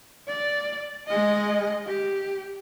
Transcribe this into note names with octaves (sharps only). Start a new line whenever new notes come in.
D5
G#3 D#5
G4